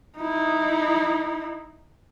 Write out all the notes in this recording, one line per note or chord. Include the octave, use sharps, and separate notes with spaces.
D#4 E4